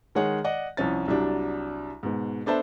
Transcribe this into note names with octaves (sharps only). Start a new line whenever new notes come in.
D#3 G#3 G#4 C#5 F#5
D5 D#5 F#5
C2 F3 C#4 A6
C2 F#3 G3 D4
G#2 B2
B3 D4 A4 C5 E5 A5